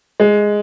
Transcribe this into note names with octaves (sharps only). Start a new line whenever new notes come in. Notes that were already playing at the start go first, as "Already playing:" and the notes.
G#3